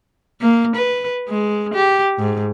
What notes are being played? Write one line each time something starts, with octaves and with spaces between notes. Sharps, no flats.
A#3
B4
G#3
G4
G#2